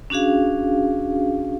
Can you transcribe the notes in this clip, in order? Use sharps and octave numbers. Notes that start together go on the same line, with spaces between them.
C#4 D4 F#4 G#4 F5